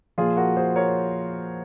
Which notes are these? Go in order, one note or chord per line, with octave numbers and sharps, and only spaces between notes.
A#2 F3 F4 G#4
F#4 A#4
G#4 C5
A#4 C#5